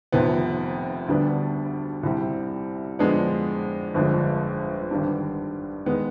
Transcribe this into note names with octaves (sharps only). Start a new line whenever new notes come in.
F1 F2 C3 D#3 B3
D2 D3 G3 B3 D4
C2 C3 G3 C4
F2 D3 G#3 B3 D4
G1 F2 D3 G#3 D4
G#1 G2 D3 G3 D4
D#3 G#3 B3